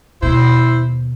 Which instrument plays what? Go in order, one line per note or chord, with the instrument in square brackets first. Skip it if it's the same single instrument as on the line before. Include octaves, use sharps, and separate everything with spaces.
[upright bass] D#2 B2 [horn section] E4 C5